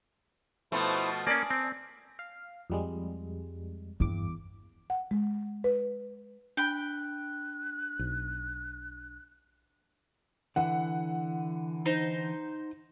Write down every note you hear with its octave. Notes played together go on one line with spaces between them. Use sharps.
B2 F3 A3 E4 C5
A#3 C#4 D5 G#5 A5 D#6
C4
F5
F2 G3 G#3
E2 G2 D6
F#5
G#3
B4
D4 G5 B5 F#6
B1
D3 E3 F#5
D#4 C5